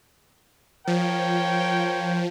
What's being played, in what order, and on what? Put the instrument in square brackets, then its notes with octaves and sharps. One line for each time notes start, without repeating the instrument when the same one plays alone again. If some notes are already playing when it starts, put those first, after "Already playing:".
[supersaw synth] F3 [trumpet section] A#4 C#5 G5